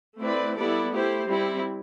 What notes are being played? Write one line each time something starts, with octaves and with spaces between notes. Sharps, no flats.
A3 C4 E4 B4 D5
G3 B3 E4 A4 D5
A3 E4 G4 C5
G3 C4 E4